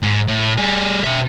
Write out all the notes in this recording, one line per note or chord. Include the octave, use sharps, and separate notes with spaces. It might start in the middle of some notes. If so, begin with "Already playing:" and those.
G#2
A2
G3 G#4
B2 E5